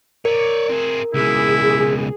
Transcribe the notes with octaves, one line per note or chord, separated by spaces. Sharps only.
A#4 C#5 D5
C4 G#4
C#2 B2 E4 G#4